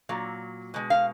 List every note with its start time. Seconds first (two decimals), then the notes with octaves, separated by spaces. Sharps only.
0.09 A#2 F#3
0.74 B2 G#3
0.90 F5